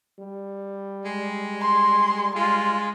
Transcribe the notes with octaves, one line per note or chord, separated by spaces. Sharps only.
G3
G#3
C6
G#3 F4